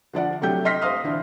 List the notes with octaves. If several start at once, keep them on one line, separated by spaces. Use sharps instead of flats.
D3 F3 D5 F#5
C3 F#3 A3 D4 G4 G6
D#5 C6 F6 A#6 B6
C5 F5 C6 D#6 F6
D3 E3 D4